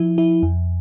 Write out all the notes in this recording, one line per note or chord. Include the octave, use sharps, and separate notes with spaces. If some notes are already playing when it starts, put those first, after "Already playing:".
Already playing: F3 E4
E4
F2